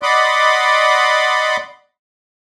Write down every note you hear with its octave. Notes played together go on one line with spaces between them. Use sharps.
D5 D#5 F#5 B5 C6 D6